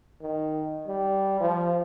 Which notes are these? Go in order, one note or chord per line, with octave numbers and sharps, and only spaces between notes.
D#3
G3
F3